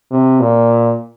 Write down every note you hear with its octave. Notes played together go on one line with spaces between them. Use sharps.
C3
A#2